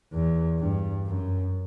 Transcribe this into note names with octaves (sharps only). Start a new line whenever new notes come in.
E2
G2
F#2